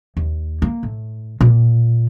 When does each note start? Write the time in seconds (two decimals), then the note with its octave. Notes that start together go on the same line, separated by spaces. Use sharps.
0.17 D#2
0.62 A#3
0.83 A2
1.41 A#2